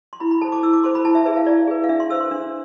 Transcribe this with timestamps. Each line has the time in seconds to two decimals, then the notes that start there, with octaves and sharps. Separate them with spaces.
0.13 C6
0.20 E4 B5
0.31 B5
0.41 A4 C5 A5
0.52 D6
0.63 E4 E6
0.73 D6
0.84 A4 C5 C6
0.95 B5
1.05 E4 A5
1.15 E5
1.25 G#4 B4 E5
1.37 F5
1.46 E4 D5
1.68 G#4 B4
1.84 F5
1.89 D4 E5
2.00 C6
2.10 A4 C5 E6
2.21 C6
2.31 D4